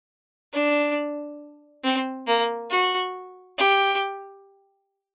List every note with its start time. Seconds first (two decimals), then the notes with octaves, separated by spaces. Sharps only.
0.54 D4
1.84 C4
2.27 A#3
2.70 F#4
3.58 G4